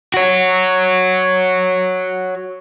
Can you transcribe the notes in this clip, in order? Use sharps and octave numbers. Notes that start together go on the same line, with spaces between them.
F#4 C#5